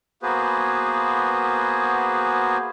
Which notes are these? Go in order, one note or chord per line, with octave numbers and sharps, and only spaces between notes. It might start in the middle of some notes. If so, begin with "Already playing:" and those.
A#3 B3 F#4 G#4 B4 C5